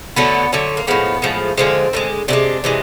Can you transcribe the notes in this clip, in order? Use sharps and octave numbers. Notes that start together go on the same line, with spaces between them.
D3 F#3 A3 B3
D3 F#3 A3
A#3
A2 F3 G#3 B3
A2 F3 G#3
D3 F3 G#3 C4
D3 F3 G#3
C3 E3 G#3 D4
C3 E3 G#3